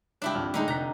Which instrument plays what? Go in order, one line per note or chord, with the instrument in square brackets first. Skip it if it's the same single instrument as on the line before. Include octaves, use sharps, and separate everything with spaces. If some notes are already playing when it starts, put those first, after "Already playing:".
[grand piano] C#2 E5 F#6 [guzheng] D4 E4 G4
[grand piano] G#1 F2 F6
[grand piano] A2 G#3 [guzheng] D3 D#4 G4
[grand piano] F1 F#6 B6 [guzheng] A#5